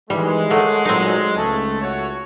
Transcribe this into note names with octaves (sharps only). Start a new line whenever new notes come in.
D#3 E3 G3 G#3
A3 A#3 A4 C#5 F#5
A#2 F#3 C4 D#4
C#2 A3 A4
A3 F#4 C#5